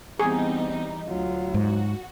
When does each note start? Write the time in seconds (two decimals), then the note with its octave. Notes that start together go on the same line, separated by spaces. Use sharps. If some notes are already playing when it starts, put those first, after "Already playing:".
0.19 E3 G3 B3 C4 D#4 G#4
1.08 D2 F#3 F4
1.54 G#2 F#4